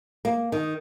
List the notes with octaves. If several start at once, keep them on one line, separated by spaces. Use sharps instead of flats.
A#3
D#3